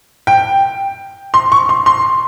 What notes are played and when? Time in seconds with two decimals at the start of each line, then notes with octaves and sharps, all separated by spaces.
0.27 G5
1.34 C6
1.52 C#6
1.69 C6
1.86 C6